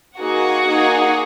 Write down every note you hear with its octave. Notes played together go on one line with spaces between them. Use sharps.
A#3 D#4 F#4 G#4 F#5
A#3 D#4 G#4